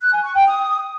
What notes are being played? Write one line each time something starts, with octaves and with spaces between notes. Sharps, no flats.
F#6
G#5
C#6
G5
D#6